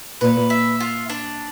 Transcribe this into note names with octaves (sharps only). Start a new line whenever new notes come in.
A#2 B4
E5
F4
D4